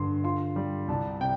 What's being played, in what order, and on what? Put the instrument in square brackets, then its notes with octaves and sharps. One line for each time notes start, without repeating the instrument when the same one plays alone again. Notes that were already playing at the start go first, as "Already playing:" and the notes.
Already playing: [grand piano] G2 D3 C6
F4 C6
G3
C2 A5
C3 G5